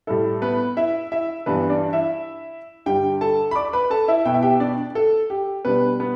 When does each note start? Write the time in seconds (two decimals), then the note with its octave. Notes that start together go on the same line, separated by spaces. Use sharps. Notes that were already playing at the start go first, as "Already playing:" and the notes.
0.07 A2 G3 E4 A4
0.42 B3 B4
0.77 E4 E5
1.12 E4 E5
1.46 G2 E3 G3 B3 D4 B4
1.70 D4 D5
1.93 E4 E5
2.86 G2 D3 G3 G4 G5
3.21 A4 A5
3.51 B5
3.56 D5 D6
3.73 B4 B5
3.90 A4 A5
4.08 E4 E5
4.25 B2 B3 E4 G5
4.34 E5
4.43 G4 G5
4.60 D4 D5
4.95 A4
5.30 G4
5.65 B2 G3 B3 D4 B4
6.00 B3 B4